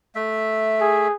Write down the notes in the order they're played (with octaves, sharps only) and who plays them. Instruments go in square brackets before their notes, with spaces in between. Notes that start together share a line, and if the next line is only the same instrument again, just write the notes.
[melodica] A3 E5
[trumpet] G#4